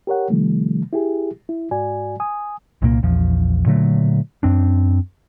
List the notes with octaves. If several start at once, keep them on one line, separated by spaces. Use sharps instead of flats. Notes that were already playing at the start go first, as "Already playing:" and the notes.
G4 A#4 C#5 F#5
C3 D#3 F3 G3 A3
E4 G4 G#4
E4
G#2 F#4 D5 G#5
G#5 D#6
C2 A#2 F3 A#3
A#1 E2 F3
A#2 D3 F#3 A3
F#2 C4 D4